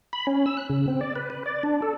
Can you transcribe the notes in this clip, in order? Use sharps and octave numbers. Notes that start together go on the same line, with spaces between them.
B5
C#4
E6
F#6
C#3
C4
D5
B4
B4
D5
D4
A4